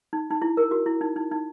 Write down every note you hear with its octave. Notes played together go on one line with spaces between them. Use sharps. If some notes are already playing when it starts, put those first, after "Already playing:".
D#4
D#4
E4
A#4
F#4
E4
D#4
D#4
D#4